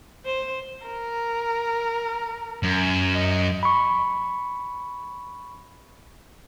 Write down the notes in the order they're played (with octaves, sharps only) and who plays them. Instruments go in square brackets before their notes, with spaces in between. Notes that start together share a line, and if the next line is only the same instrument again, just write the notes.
[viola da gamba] C5
[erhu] A#4
[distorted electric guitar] F#2
[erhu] D#5
[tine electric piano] B5 C#6